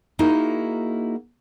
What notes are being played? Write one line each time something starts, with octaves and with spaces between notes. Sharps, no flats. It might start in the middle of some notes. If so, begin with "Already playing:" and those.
A#3 D#4 E4 F#4 G#4 A#4